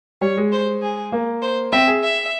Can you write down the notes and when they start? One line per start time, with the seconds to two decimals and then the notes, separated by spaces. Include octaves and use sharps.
0.21 G3 C#5
0.37 G#3
0.52 C5
0.82 G#4
1.12 A#3
1.42 C5
1.72 C4 E5
1.87 G#4
2.03 E5